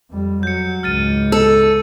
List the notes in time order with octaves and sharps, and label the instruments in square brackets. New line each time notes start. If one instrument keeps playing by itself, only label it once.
[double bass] F2 G3
[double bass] F#3 [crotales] G6 C#7
[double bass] C#2 G#2 [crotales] F6 A6 D#7
[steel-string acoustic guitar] A4 [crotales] E6